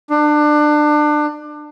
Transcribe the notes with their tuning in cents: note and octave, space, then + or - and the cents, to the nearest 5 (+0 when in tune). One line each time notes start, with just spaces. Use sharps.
D4 +25